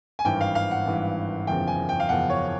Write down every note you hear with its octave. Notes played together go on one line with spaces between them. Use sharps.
G#5
G#1 G2 E3 G5
F5
F5
F#5
G#1 G2 E3
F#1 E2 C#3 F3 G5
G#5
G5
F5
F#1 E2 C#3 F3 F#5
C#5